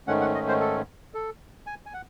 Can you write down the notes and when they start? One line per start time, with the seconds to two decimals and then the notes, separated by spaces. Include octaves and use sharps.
0.07 G#2 D#3 A3 C#4 F#5
0.21 F#5
0.35 D#5
0.48 C5
0.60 A4
1.14 A4
1.67 G#5
1.86 G#5
1.94 F#5